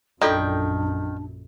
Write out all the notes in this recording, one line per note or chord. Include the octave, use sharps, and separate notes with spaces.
A#1 F#2 D#3 D4 F4 A4 D5 G5